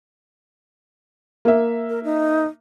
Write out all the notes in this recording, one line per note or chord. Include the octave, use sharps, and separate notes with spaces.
A#3 E5
A#4
D#4